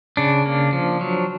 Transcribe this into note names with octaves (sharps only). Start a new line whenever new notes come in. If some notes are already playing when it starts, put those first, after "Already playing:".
C#3 D4
A#3
F3
F#3